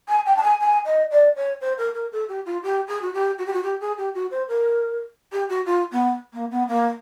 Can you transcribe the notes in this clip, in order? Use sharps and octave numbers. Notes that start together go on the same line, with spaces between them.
G#5
G5
A5
G#5
G#5
D#5
D5
C#5
C5
A#4
A#4
A4
G4
F4
G4
G#4
F#4
G4
F#4
G4
F#4
G4
G#4
G4
F#4
C5
A#4
G4
F#4
F4
B3
A#3
B3
A#3